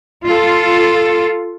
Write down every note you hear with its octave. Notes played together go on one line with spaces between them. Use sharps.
F4 A4